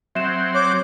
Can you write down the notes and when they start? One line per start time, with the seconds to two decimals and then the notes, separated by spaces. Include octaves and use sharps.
0.15 F#3 C4 E5 E7
0.54 C#5 D6